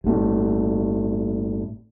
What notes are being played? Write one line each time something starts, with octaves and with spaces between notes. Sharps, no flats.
G1 A2